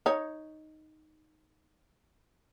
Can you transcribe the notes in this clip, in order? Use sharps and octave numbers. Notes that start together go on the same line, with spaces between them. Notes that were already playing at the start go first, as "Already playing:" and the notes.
D#4 C#5